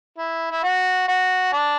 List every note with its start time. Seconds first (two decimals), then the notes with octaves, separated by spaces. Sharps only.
0.18 E4
0.51 E4
0.63 F#4
1.08 F#4
1.53 D4